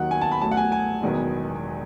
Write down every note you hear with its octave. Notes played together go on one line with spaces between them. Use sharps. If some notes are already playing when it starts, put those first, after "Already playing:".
Already playing: D#2 D#3 F#3 F#5
G#5
A5
B5
A1 A2 F#3 A5
F#5
G#5
G#5
E1 E2 D#3 F#3 B3